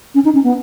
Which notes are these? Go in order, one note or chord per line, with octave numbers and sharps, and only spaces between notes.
C#4
D#4
C#4
B3